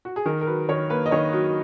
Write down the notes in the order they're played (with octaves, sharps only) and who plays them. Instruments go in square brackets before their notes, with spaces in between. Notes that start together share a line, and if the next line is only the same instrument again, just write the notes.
[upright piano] F#4
G#4
D#3 A#4
A#4
F#3 B4
D#3 C#5
A#3 B4
D#5
D#3 C#5
F#3